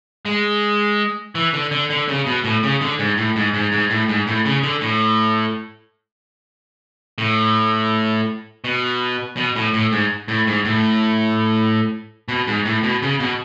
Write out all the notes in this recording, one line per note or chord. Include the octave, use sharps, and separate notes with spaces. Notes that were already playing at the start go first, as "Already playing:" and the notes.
G#3
E3
D3
D3
D3
C#3
B2
A2
C#3
D3
G#2
A2
G#2
G#2
G#2
A2
G#2
A2
C#3
D3
A2
A2
B2
B2
A2
A2
G#2
A2
G#2
A2
B2
G#2
A2
B2
C#3
B2